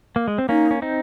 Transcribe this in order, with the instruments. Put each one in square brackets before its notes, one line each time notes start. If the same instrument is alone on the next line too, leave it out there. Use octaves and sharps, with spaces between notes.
[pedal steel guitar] A#3
G#3
C4
[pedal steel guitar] A#3 C#4 [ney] D#4
[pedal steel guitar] C#4
C4 D#4